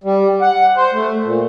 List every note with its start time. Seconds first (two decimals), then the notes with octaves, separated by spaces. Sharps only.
0.04 G3
0.41 F#5
0.77 C5
0.93 A3
1.24 A#2